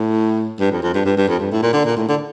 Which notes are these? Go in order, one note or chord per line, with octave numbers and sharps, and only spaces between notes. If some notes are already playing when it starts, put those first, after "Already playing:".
Already playing: A2
G2
F2
F2
G2
G2
G2
F2
G2
A2
A#2
D3
A#2
A2
D3